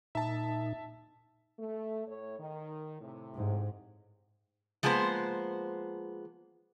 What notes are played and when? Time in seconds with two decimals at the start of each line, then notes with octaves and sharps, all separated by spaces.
0.15 A#2 D#4 E5 A5
1.59 A3
2.06 A2 C#5
2.39 D#3
3.01 A2 C3
3.35 G#2
4.83 F3 G#3 A#3 B3 C5